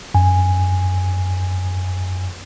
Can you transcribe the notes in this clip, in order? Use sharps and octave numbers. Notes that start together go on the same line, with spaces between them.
F#2 G#5